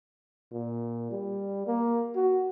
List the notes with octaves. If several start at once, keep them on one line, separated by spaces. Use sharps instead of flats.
A#2
G3
A#3
F#4